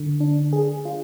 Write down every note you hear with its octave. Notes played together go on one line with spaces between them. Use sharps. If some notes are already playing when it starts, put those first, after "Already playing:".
Already playing: D3
D4
G#4
F4